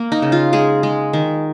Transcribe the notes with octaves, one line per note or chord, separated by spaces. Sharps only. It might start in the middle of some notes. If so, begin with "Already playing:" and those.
Already playing: A#3
D#4
C#3
F4
G#3 G#4
G#3
D#3